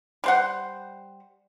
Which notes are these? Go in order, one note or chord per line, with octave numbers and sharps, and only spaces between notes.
G3 C5 F#5